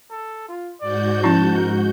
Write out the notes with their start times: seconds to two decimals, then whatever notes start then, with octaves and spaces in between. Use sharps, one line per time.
0.11 A4
0.48 F4
0.81 G#2 F#4 D5 G6
1.23 F3 C#4 E4 A5
1.57 A#4